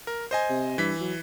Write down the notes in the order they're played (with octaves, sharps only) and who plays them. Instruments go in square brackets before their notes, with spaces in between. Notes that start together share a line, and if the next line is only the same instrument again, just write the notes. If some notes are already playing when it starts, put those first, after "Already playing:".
[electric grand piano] A#4
C5 D#5 G#5
[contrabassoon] C3
[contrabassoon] G2 [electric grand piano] E3 B6
[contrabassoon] F#3